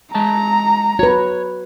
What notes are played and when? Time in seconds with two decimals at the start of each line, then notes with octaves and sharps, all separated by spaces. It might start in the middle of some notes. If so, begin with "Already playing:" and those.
0.15 G#3 A5 A#5
0.99 F#4 B4 C#5